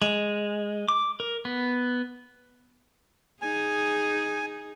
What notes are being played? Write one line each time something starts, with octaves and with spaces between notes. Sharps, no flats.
G#3
D6
A#4
B3
D#4 G#4 G#5